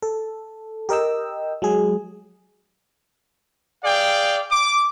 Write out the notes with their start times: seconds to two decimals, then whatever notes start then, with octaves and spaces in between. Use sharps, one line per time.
0.02 A4
0.89 G4 A#4 D#5 G5 E6
1.62 F#3 G#3 G#4
3.84 G#4 D5 F5 G5
4.51 D6